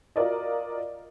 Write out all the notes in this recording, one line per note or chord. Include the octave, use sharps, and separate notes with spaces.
F4 F#4 A#4 D5 D#5